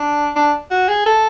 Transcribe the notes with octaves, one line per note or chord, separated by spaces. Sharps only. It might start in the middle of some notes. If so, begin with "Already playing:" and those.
Already playing: D4
D4
F#4
G#4
A4